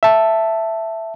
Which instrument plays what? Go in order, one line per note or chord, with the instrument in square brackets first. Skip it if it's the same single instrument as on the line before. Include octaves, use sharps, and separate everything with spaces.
[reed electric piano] E5 A5